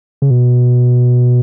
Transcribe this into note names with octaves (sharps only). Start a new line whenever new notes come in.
C#3
B2